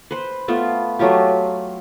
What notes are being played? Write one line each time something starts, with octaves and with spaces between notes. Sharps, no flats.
B4 C5
A3 B3 F4
F#3 A3 F4 G4